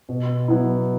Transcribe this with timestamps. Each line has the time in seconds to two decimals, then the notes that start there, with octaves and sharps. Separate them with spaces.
0.09 B2
0.48 F#3 B3 E4